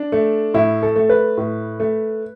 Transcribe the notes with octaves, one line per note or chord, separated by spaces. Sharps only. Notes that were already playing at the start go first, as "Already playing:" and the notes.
Already playing: D4
A3
A2 E4
A4
A3
B4
A2
A3